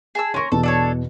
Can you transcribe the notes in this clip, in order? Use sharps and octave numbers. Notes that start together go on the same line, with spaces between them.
G#4 A5 E6
C#4 A#4 C6 C#6
E2 B2 A4
D4 A4 C#5